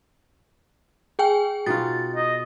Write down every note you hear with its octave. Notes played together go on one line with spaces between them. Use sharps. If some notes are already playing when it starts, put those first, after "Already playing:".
G#4 G5 G#5
B2 D#4 F4 A6
D#5